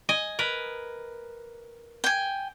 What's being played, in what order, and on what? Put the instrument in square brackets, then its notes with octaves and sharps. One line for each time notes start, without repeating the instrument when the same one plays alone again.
[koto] D#5 G#5
A#4 B4
[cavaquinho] G5 G#5